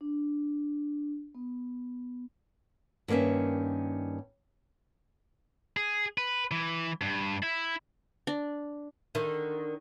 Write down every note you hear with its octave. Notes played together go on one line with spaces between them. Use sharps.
D4
B3
G2 D#3 A#3 C#4 E5
G#4
B4
E3
G2
E4
D4
D3 D#3